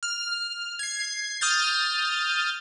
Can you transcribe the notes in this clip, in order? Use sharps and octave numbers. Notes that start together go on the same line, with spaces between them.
F6
G#6 C7
D#6 F6 G6 A6